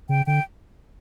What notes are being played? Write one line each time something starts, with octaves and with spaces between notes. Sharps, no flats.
C#3 G5
D3 G5